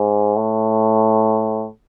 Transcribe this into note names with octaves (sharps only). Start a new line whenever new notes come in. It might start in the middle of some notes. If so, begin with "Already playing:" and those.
Already playing: G#2
A2